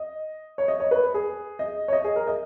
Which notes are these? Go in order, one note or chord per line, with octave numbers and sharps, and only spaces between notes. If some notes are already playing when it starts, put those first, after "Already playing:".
Already playing: D#5
C#5
D#5
C#5
B4
G#4
D#5
C#5
D#5
G#4
A#4
D#5